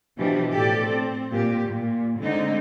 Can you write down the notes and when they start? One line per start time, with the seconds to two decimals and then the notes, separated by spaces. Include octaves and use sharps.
0.17 B2 E3 F3 D4 G4
0.51 A2 G4 A4 D5
0.86 C4
1.32 A#2 G4
1.68 A#2
2.19 D3 G#3 C4 D#4